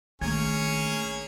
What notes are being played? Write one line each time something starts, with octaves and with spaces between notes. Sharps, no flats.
A#1 D#3 A3 A#3 C#4 D4 G#4 G#6